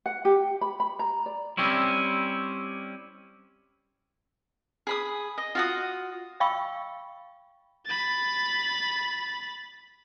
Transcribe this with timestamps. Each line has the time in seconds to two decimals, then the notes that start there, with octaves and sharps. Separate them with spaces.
0.06 F#5
0.25 G4
0.61 B5
0.80 B5
0.99 A#5
1.26 D5
1.57 G3 C4 C#4 E4
4.87 G#4 B5 D#6
5.38 D#5
5.55 F4 F#4 D#6
6.40 D#5 F5 G5 B5 C#6 E6
7.86 B5 A6